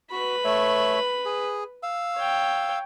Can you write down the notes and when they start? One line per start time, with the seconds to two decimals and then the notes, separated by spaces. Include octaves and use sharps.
0.11 F#4 B4 B5
0.44 A3 C#5 E5
1.25 G#4
1.83 F5 E6
2.16 C#5 G5